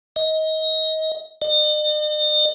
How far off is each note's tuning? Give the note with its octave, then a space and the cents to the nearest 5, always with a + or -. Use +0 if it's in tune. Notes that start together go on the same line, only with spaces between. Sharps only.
D#5 +25
D#5 -45